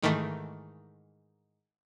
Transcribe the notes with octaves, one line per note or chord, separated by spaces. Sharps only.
G#2 D#3 E3 A3